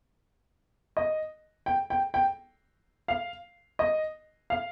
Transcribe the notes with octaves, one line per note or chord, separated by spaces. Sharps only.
D#5
G5
G5
G5
F5
D#5
F5